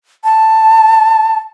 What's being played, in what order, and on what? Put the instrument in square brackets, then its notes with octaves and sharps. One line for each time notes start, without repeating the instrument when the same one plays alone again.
[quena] A5